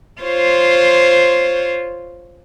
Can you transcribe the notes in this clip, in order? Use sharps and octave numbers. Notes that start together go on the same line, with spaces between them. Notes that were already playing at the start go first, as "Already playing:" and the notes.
F4 C5 C#5